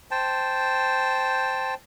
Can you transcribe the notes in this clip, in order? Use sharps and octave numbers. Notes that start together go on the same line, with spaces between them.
C5 G5 A5